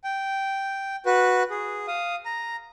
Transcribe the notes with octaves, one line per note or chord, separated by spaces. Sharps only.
G5
F#4 B4
G#4
F5 D#6
A#5